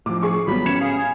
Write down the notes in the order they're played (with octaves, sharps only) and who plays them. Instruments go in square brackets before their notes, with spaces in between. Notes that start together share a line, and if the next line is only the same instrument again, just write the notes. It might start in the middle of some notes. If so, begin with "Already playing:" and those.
[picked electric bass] A2 F3 [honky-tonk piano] D6
[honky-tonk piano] G#4 C#6
[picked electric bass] G#1 B3 [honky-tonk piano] F#3 G3 [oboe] B5
[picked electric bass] A2 C#4 [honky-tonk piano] G#6 C#7 E7
[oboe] G#4 [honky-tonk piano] F5
[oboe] G#5